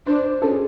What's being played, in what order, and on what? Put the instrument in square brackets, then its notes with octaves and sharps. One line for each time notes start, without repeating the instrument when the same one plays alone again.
[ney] D4 [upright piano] C5
[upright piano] C5
[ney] C#4 [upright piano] A4
[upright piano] G#4